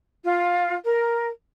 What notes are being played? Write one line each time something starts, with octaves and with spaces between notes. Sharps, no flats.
F4
A#4